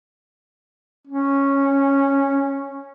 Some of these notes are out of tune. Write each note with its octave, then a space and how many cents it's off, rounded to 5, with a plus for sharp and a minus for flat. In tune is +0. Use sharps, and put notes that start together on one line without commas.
C#4 -5